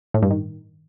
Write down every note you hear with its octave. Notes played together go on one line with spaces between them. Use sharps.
A2
G2
D#3